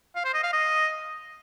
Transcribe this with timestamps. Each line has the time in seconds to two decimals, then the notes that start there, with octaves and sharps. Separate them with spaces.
0.15 F5
0.25 C5
0.34 D#5
0.43 F5
0.53 D#5